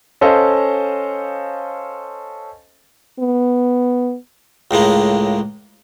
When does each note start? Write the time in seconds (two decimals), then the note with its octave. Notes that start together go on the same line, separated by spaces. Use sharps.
0.21 C#4 A4 C5 D#5 F5
3.19 B3
4.71 C#2 A2 G#3 A#3